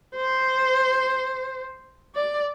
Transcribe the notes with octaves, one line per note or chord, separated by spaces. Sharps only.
C5
D5